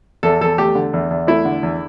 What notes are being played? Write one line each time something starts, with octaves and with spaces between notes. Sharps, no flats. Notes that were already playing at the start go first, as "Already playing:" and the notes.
E2 A4
E2 A4
A3 G4
D3
E2
E2
A3 E4
D3
E2